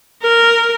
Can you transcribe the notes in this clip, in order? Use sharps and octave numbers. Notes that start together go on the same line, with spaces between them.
A#4